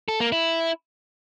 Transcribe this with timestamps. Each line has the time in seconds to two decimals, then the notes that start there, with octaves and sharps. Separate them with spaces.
0.08 A4
0.20 A#3
0.32 E4